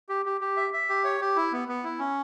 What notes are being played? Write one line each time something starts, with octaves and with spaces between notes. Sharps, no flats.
G4
G4
G4
E5
E5
G4
C#5
G4
E4
B3
B3
E4
C#4